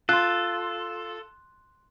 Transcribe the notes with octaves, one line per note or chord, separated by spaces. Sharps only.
F4 A4 C6 F#6